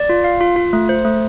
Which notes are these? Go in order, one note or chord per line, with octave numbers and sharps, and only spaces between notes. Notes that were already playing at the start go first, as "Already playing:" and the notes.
Already playing: D5
F4
F5
F4
F4
A3
C5
A3